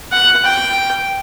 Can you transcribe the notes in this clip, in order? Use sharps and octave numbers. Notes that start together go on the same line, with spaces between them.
F#5
G5